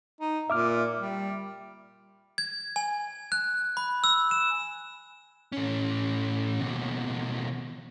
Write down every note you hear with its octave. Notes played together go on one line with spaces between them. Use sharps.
D#4
A#2 E5 D6 F6
G3
G#6
G#5
F#6
B5
E6
E7
A2 C#4
D#2 B2